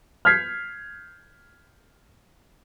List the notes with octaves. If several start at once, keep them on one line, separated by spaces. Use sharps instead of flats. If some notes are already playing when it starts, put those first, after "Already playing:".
F6 G6 G#6 B6 C7